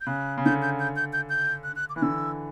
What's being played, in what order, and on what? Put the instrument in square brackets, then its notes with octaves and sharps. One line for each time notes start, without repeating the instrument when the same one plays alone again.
[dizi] G6
[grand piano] C#3 [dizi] F#6
[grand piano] C#3
[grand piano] D3 [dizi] G6
[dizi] G6
G6
G6
G6
G6
F#6
F#6
D6
[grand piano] E3 [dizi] F#6
[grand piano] D3 [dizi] E6